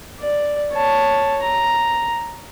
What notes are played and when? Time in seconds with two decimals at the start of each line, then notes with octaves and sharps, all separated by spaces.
0.20 D5
0.73 C#5 A5
1.42 A#5